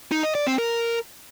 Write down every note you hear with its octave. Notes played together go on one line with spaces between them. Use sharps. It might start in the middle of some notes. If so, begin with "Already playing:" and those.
D#4
D#5
D5
C4
A#4